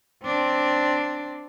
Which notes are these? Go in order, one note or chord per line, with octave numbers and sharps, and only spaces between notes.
C4 D4